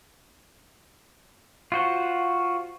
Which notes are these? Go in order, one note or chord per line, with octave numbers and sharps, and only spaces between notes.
F4 F#4 C5